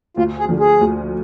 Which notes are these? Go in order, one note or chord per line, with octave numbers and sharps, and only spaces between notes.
D2 F4
G#4
D3 F3
G#4
D2